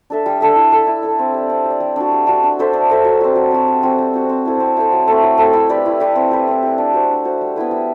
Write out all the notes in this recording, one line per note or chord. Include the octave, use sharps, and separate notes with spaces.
D4 A4 E5
G3
D4 A4 E5
E4
A4 E5
E4
A4 E5
C4
G4 D5
C4
G4
D5
G3
D4 F#4
G3
D4 F#4
D4
A4 C5 E5
D4
A4 C5 E5
F#3
C4 F#4
F#3
C4 F#4
G3
C4 F#4
G3
C4 F#4
C4
E4 A4 C5
C4
E4 A4 C5
F#3
A3 C4
F#3
A3 C4
E4
G4 B4 D5
E4
G4 B4 D5
C4
G4 B4
C4
G4 B4
D4
F#4 C5
D4
F#4 C5
G3
B3 E4 B4
G3